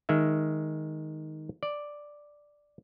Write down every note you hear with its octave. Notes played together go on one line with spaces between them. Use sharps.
D#3 G#3 E5
D5